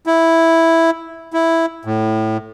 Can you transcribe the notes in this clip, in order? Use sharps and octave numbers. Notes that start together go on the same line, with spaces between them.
E4
E4
A2